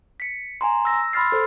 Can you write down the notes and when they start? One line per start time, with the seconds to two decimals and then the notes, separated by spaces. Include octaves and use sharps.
0.20 B6 C#7
0.61 G#5 A#5 C6
0.85 E6 A#6
1.13 B5 C6 E6 F6 A6 C7
1.32 A4 C5